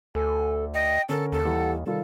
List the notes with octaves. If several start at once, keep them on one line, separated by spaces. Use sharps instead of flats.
D2 A4 G#5
D#5 G5
D3 C#4 A4 A#4
D#2 A4
E3 G3 F#5
C3 D#3 G3 F4 A4